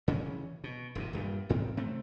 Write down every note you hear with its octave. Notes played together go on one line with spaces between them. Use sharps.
C#3 E3 G#3 C#4
B2
E1 F#2 C3
D#1 G2 A#2 G3
A1 G#2 D#3 C4
C3 A3 C4